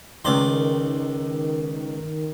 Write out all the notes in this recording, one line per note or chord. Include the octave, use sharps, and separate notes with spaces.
C#2 D#3 D5 C6